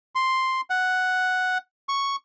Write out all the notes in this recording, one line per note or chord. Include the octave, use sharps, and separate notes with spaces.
C6
F#5
C#6